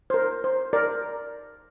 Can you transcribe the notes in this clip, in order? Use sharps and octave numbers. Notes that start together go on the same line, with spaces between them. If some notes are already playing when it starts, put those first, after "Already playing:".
C5
A#4
C5
A#4 D5